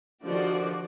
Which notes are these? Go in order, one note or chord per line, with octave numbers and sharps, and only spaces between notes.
D3 D#3 F3 F#4 G4 D5